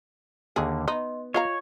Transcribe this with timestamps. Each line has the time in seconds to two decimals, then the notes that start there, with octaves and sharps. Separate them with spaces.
0.56 D#2 D3 A#3 G#4
0.88 B3 D#4 D#5 C6
1.34 F4 C#5 D#5 F5 A#5